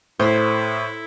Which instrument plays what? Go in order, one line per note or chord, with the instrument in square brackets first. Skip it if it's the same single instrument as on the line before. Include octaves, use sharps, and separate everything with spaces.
[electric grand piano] A2 [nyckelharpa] E4 A4 [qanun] C5